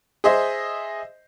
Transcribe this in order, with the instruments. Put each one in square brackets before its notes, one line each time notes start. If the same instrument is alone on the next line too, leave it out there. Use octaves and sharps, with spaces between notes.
[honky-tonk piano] G#4 C5 D#5 E5